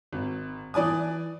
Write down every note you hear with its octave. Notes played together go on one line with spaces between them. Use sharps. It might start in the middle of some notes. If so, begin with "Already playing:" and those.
G#1
E3 D5 G#5 D#6